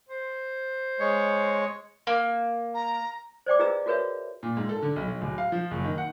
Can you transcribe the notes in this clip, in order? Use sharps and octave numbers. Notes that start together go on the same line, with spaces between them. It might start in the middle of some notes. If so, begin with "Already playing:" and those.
C5
G#3 C#5
A#3
A#5
C5 D5 G5 D6
F4 G#4 B4 D#5 A#5 E6
F4 F#4 A#4 B4 C#5 E5
A#2
G#2
A4
D3
B1
B1
D1
F5
F3
F#1
D#3
F#5